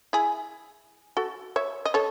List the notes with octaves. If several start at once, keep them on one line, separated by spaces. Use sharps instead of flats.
E4 G#4
F#4 A4
C#5 E5
D#5
A4 C#5